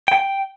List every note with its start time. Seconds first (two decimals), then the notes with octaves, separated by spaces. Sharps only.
0.08 G5